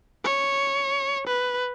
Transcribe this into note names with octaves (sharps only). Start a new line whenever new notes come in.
C#5
B4